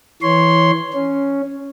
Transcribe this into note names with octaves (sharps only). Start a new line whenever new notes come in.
E3 C#5 C6
C#4